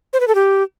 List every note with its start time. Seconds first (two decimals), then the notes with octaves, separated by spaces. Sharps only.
0.13 C5
0.20 B4
0.28 A4
0.35 G4